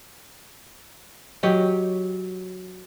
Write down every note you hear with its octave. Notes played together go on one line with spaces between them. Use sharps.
F#3 G4 C#5 D#5